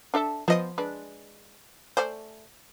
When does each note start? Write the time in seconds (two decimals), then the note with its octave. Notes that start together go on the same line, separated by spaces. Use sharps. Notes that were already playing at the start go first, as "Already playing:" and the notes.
0.14 D4 A4 E5
0.48 F3 B3 C5 D#5 D#6
0.78 G#3 D4 B4
1.97 A3 C5 D5 G#5